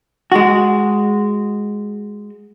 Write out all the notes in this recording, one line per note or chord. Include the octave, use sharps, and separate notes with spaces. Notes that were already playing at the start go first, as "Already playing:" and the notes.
G#3 F#4